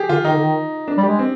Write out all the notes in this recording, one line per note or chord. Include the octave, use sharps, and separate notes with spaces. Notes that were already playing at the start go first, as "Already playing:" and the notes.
Already playing: G4 G#4
D3 F4
D#3 D#4
D3
D#3
D4
G3
G4
G#3
C4